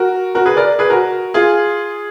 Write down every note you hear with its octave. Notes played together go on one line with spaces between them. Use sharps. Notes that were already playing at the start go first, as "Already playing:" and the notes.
Already playing: F#4 A#4
F#4 A#4
G#4 B4
A#4 D5
G#4 B4
F#4 A#4
F4 G#4